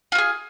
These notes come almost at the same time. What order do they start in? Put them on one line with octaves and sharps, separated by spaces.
F4 F#4 G#4